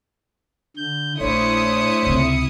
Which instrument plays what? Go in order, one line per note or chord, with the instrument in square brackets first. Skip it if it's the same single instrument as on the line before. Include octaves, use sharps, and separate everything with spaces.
[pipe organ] D3 G6
[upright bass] A#1 [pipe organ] A3 D4 C5 [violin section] E4 D#6 C#7 [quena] C#5
[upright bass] C#2 C3